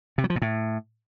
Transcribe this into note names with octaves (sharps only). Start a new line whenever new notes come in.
C3
F#3
F3
A#2
A2